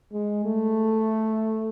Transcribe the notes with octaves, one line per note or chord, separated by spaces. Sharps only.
G#3
A3